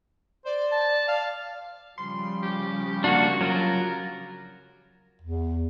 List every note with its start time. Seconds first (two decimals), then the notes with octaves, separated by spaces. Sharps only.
0.45 C5 D5
0.71 A5
1.08 F5
1.98 C#3 F3 G3 C6
2.43 G4
3.04 A#3 D4 F#4
3.41 F#3 F4 A#4
5.22 E2